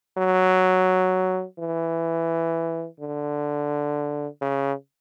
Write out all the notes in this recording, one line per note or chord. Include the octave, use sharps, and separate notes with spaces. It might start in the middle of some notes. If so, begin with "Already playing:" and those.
F#3
E3
D3
C#3